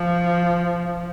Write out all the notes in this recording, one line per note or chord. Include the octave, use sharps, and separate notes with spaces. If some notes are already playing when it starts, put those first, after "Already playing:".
Already playing: F3